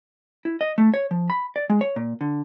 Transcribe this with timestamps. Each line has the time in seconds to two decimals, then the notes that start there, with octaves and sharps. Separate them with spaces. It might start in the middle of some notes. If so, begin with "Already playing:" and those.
0.45 E4
0.61 D#5
0.78 A3
0.94 C#5
1.11 F3
1.30 B5
1.56 D5
1.70 G#3
1.81 C#5
1.96 A#2
2.21 D3